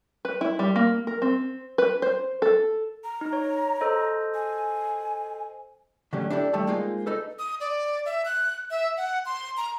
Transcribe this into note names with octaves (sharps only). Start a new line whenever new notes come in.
B4
E4
G3
A#3
A#4
C4
B4
C5
A4
A#5
D#4
C#5
A4 C5 D#5
G#5
D3 F#3 A3 C#4 G4
D4 E4 G4 A4
D#3 G3 A3 A4 A5
G#3 A#3 D#4 F4 C5
D#4 A4 B4
D#6
D5
E5
F#6
E5
F#5
C6
A#5